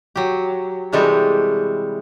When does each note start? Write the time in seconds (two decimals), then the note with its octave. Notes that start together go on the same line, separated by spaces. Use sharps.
0.16 F#3 G4
0.92 C3 E3 G3 G#3 F#4 A4